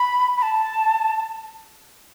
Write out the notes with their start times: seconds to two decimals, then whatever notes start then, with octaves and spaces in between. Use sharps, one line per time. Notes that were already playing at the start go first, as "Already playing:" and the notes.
Already playing: B5
0.37 B5
0.43 A5